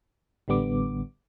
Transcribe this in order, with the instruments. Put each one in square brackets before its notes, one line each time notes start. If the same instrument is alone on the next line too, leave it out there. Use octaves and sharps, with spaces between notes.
[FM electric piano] A1 D3 G3 B3 D6